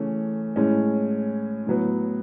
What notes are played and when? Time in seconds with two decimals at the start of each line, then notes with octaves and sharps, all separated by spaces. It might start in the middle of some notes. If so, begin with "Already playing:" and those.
Already playing: C#3 E3 A3 C#4
0.56 A2 G#3 C#4
1.67 A2 F#3 B3